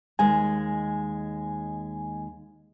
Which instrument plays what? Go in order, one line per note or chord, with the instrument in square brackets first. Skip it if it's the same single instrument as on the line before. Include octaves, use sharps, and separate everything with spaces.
[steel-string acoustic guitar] D#2 G#3 [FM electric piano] G#5